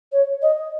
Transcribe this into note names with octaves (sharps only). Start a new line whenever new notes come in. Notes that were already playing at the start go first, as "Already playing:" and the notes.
C#5
D#5